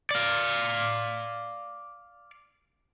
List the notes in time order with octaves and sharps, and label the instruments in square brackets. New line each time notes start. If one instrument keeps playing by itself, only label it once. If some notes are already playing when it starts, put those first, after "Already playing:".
[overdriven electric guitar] D5 F5